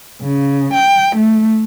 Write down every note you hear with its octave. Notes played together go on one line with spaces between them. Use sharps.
C#3
G5
A3